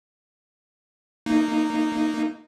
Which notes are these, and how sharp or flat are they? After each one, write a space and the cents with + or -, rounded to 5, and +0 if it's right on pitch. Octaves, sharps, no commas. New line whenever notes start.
A#3 -15 D#4 -15